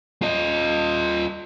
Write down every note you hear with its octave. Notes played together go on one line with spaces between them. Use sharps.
F4 D#5